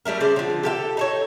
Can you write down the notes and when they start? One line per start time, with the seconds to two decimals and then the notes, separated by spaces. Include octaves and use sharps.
0.05 F#3 G3 A3 A#4
0.20 C#3 C5 D5
0.36 D3 F3
0.63 G4 A4 F5 G5
0.97 D#4 A4 C#5